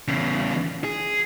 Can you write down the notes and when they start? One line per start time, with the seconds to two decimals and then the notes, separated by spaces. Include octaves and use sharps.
0.08 E2 C#3
0.84 G#4